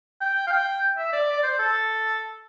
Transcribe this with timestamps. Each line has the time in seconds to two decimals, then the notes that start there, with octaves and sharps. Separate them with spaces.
0.21 G5
0.47 F5
0.53 G5
0.98 E5
1.13 D5
1.33 D5
1.43 C5
1.59 A4